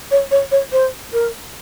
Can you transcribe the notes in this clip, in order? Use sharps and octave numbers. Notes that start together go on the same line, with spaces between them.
C#5
C#5
C#5
C5
A#4